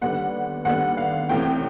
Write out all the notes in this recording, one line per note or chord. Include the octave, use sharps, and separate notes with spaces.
D#2 D3 G3 B3 F#5
D#2 D3 G3 B3 F#5
F5
C2 C3 E3 A3 C#4 G5